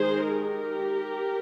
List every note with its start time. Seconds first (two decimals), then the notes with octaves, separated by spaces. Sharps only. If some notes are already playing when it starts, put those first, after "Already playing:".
Already playing: D#3 G#3 D#4 G#4 C5
0.28 G4 A#4